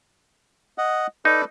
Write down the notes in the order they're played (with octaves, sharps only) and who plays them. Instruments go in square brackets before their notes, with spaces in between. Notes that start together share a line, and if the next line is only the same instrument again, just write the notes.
[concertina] D#5 F#5
[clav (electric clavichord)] D#4 [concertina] A4 B4 D5